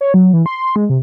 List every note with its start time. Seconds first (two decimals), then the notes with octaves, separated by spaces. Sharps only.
0.01 C#5
0.14 F#3
0.33 E3
0.46 C6
0.76 G#3
0.90 C3